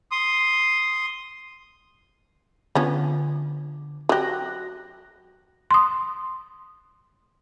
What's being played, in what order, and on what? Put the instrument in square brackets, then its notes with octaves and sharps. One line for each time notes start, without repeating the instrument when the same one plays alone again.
[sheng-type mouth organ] C6 D#6
[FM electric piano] D3 [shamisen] F3 B3 C#4
[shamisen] F#3 G4 [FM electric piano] F#4 F#6 A#6
[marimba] C6 D#6